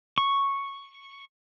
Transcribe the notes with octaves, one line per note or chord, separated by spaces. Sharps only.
C#6